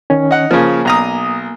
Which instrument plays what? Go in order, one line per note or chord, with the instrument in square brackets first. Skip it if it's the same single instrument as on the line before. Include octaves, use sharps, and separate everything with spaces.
[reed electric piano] D#3 C#4
[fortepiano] D#4 F#5
[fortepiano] C#3 F3 [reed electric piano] A#3 G#5
[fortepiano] B1 A#5 D#6